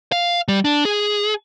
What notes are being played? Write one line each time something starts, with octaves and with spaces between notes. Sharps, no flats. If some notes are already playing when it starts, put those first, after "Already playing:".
F5
G3
D4
G#4